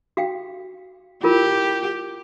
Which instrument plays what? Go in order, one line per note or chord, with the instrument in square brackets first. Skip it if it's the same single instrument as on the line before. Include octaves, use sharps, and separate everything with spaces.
[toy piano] F#4 F5 G5
[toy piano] E4 F4 A#4 [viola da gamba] G4